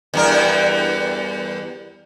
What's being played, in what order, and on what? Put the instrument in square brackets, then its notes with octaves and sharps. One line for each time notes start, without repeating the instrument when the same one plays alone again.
[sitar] E2 G2 A#4